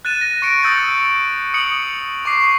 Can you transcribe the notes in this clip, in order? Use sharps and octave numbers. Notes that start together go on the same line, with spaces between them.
F#6 A6 D#7 E7
A#6
C#6 A#6 C#7 D7
D#6 E6 G6 A6 C#7
D#6 C#7 F#7
C#6 D6 C7